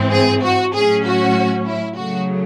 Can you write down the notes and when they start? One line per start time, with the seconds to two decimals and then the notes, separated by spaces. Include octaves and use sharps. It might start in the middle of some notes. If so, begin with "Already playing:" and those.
Already playing: G#2 E3 C4
0.11 G#4
0.43 F#4
0.74 A2 F#3 C#4 G#4
1.05 F#4
1.66 E4
1.97 C#3 F#3 A3 F#4